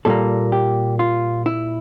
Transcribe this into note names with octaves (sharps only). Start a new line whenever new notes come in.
A#2 G3 A#3 A4
G4
F4
E4